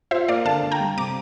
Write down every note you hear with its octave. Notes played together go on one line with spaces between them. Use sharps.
F4 C5 E5
A#3 D5 F5
D3 F5 A5
D3
G5 A#5
G3
C3 A#5 D6